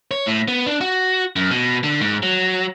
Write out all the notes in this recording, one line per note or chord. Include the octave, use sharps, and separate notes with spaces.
C#5
A2
B3
D4
F#4
F#2
B2
D3
G#2
F#3